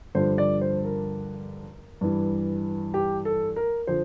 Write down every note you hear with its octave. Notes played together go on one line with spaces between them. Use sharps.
G2 D3 F3 C5
D5
C5
A#4
G2 E3
G4
A4
A#4
D3 F3 C5